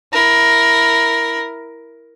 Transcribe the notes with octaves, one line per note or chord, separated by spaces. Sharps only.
E4 A#4